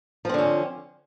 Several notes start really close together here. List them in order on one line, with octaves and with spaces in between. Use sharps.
F3 C4 D3 C#4